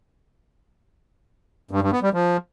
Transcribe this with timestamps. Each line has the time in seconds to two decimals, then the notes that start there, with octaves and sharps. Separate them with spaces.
1.71 G2
1.82 G2
1.92 B3
2.03 G3
2.13 F3